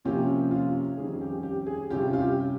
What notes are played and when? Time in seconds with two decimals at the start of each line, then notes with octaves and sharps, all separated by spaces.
0.05 C3 F3 A#3 C#4 F4 G4
0.51 F4
0.97 F2 D#3 G3 C#4 G#4
1.21 G4
1.43 G4
1.66 G#4
1.90 C3 G3 C#4 F4 G4
2.13 F4
2.21 G4